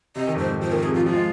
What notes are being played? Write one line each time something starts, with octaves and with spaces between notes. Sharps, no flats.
C3 D#5
D#3
F2
G#2 C5
G#2
F3 C5
D#3 A#4
C3 G#4
F3 F4
F3 F4
G#3